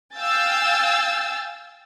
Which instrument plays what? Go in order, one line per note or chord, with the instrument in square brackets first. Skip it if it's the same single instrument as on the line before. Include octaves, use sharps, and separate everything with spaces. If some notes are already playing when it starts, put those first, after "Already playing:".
[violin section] F5 G5 G#5 E6 G6 A6